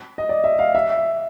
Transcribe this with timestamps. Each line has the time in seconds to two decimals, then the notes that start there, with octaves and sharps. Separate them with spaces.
0.18 D#5
0.29 D5
0.44 E5
0.59 F5
0.75 E5